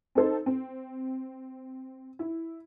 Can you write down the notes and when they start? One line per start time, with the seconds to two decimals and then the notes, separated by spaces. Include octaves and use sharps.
0.15 C4 D#4 A4 C5
0.46 C4
2.19 E4